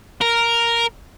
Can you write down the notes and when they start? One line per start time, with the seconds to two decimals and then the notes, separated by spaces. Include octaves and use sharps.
0.21 A#4